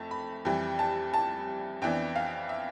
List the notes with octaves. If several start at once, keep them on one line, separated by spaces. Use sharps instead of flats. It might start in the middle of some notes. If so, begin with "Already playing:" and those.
Already playing: F2 A3 A5
B5
F2 E3 G3
A5
A5
F2 E3 B3 D4 G5
F5
E5